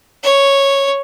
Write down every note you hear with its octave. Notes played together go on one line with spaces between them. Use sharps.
C#5